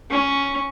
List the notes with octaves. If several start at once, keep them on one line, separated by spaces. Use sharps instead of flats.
C#4